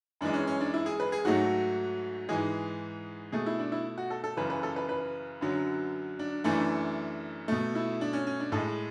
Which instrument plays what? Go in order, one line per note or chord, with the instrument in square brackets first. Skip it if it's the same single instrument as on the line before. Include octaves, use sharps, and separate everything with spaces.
[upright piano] F#2 E3 G#3 D4
C#4
C#4
D4
E4
G#4
B4
G#4
G#2 F#3 A3 F#4
G#2 E3 G#3 G#4
B2 A3 G#4
E4
D4
E4
F#4
A4
A4
F#2 C#3 E3 B4
B4
A4
B4
B4
F#2 D3 F#3
D4
F#2 E3 A3 D4
B2 A3
E4
D4
C#4
C#4
D4
A2 G#3 A4